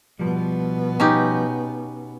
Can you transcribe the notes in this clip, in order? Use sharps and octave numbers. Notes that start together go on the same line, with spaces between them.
B2 F3 G3 B3
C#4 D#4 G4